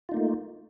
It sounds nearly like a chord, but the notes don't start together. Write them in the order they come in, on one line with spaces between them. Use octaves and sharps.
F4 D#4 A#3 A3